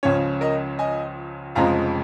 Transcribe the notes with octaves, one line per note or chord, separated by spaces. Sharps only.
C#2 C#3 F3 C#4 C#5
A#4 D#5
D#5 G#5
F1 F2 C#3 F3 G#3 F5 A#5